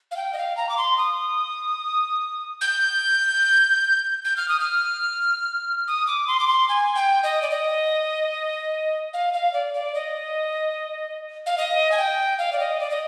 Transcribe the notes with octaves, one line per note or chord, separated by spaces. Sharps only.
F5
G5
D#5
F5
A#5
D6
C6
D#6
G6
G6
F6
D#6
F6
D#6
D6
C6
D6
C6
G#5
G5
D#5
D5
D#5
F5
F5
D5
D5
D#5
F5
D#5
G#5
G5
F5
D5
D#5
D5
D#5